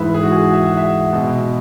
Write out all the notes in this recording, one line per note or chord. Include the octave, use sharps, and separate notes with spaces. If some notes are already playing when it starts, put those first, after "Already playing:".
Already playing: G#2 E3 G#3 B4 E5
G#4
F#4
G#4
E5
F#5
E5
B2 G#3